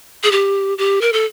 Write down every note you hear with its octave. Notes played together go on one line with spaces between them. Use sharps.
G#4
G4
G4
A#4
A4